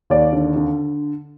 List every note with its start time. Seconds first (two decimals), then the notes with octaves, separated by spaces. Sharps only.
0.10 D#2 D5
0.33 D3
0.56 D3